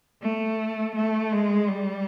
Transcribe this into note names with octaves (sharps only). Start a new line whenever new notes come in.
A3
A3
G#3
G3